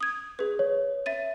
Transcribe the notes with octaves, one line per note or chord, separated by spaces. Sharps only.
D#6 G#6
G#4 B4
C#5
E5 A6 D#7